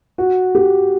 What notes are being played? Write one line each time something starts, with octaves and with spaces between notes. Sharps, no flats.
F#4
G4